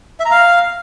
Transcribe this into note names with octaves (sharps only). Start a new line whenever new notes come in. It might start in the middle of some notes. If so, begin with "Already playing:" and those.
E5
A#5
F5